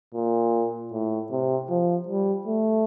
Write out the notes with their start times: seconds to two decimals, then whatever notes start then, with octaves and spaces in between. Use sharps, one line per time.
0.14 A#2
0.92 A2
1.31 C3
1.69 F3
2.08 G3
2.47 A3